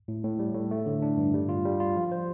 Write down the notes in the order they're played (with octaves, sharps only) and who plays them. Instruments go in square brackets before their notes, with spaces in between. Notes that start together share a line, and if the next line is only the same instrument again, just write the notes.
[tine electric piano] A2
A2
G3
A2
A3
D3
D4
G2
G3
F4
G3
F4
F3
C5